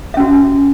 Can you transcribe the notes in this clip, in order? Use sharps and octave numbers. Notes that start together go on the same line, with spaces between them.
C#4 F#4 E5